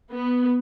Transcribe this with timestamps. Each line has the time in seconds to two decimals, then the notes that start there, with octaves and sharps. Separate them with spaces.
0.13 B3